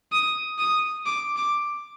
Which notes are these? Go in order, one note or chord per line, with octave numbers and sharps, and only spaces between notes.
D#6
D#6
D6
D6